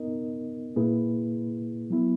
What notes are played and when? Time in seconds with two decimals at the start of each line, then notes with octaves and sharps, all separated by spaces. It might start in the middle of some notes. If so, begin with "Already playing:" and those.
Already playing: B3 D#4 A#4 D#5
0.76 A#2 A#3 E4 G#4 B4
1.90 F#3 B3 E4